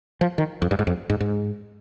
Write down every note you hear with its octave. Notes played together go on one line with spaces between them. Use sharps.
F3
D#3
F2
G2
G#2
F2
G#2
G#2